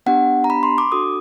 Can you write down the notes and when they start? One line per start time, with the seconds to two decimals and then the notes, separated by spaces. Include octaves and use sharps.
0.06 B3 D4 G4 F#5
0.44 A#5
0.50 B5
0.63 C6
0.78 D6
0.92 D4 F#4 A4 D#6